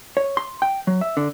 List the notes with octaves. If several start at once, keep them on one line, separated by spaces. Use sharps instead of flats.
C#5
C6
G5
F#3
E5
D3